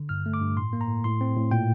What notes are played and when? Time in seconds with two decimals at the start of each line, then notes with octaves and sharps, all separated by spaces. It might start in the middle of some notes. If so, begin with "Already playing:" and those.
Already playing: D3
0.09 G2 F6
0.26 A3
0.34 D6
0.41 G2
0.57 A2 C6
0.73 A#3
0.81 A#5
0.88 A2
1.04 A2 C6
1.21 C4
1.37 A2
1.51 A#2 G5